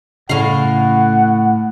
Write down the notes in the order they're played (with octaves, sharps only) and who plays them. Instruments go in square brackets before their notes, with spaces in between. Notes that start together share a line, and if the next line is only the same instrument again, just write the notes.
[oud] A2 F5 [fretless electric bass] C#3 [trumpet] F#5